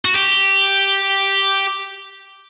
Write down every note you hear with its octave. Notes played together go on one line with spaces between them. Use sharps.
F#4
G4